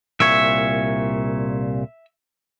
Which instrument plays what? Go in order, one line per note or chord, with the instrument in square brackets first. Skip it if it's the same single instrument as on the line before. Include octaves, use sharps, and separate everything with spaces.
[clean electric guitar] C2 A#2 C#5 [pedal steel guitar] E5